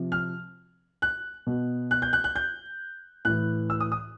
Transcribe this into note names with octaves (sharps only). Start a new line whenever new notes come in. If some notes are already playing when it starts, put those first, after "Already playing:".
Already playing: C3 F3
F6
F#6
B2
F#6
G6
F#6
F#6
G6
A2 E3 F#6
E6
D#6
D#6